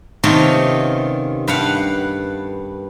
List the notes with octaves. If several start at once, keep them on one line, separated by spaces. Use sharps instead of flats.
C3 D#3 A3 B3 C#4 F4
G2 B4 F5 F#5